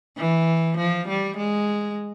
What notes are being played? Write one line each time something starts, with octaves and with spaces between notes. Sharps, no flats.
E3
F3
G3
G#3